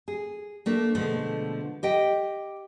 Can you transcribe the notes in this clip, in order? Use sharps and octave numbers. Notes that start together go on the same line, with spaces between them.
G#4
A3 A#3 D4
B2 D3 F3 G#3 A3
G4 D#5 G5